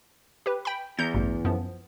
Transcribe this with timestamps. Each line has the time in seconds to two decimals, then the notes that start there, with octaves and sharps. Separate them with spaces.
0.46 G4 B4
0.65 G5 B5
0.99 E2 A#5 G6
1.14 A1 D2 G2
1.45 F#2 F3 B3